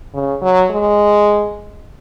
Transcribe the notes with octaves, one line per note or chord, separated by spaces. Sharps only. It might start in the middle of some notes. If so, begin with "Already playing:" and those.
C#3
F#3
G#3